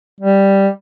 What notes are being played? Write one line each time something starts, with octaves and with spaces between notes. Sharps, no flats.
G3